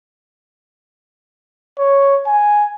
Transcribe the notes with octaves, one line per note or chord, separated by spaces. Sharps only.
C#5
G#5